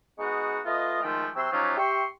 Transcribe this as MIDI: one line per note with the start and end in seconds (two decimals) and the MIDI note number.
0.19 0.59 56
0.19 0.59 59
0.19 0.59 63
0.19 0.59 66
0.19 0.59 85
0.19 0.59 87
0.66 1.01 57
0.66 1.01 65
0.66 1.01 71
0.66 1.01 75
1.02 1.28 51
1.02 1.28 53
1.02 1.28 56
1.02 1.28 57
1.02 1.28 79
1.35 1.49 48
1.35 1.49 54
1.35 1.49 79
1.35 1.49 84
1.35 1.49 88
1.51 1.75 53
1.51 1.75 54
1.51 1.75 61
1.51 1.75 63
1.51 1.75 65
1.51 1.75 67
1.76 2.04 67
1.76 2.04 76
1.76 2.04 79
1.76 2.04 84
1.76 2.04 85